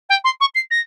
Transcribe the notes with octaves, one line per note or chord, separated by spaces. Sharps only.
G5
C6
C#6
C7
A#6